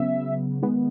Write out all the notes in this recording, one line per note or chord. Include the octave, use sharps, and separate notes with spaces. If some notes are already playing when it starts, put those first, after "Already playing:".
Already playing: C#3 F#3 B3 E5
D#3 G#3 B3